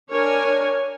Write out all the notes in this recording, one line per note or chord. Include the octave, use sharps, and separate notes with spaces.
D4 A#4 C#5 G#5